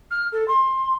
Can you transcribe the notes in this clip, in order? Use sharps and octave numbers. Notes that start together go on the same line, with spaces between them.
F6
A4
C6